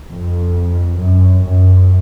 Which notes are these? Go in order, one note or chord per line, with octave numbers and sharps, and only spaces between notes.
F2
F#2
F#2